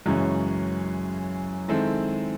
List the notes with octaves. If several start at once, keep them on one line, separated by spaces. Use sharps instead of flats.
F#2 C#3 E3 G#3 C#4
D#3 G#3 C4 E4 A4